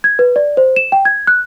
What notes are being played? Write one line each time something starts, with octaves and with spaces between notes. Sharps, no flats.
G#6
B4
D5
C5
E7
G5
G#6
F#6